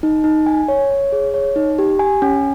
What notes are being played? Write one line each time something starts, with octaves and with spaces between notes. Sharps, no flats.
D#4
D#4
G#5
C#5
C#5
G#4
C#5
D#4
G4
G#5
C#4